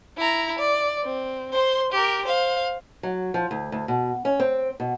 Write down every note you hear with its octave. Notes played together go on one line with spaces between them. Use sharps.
E4 A#5
D5
C4
C5 C6
G4 A#4
C5 F5
F#3
F3
D2
D2
B2
C#4
C4
B2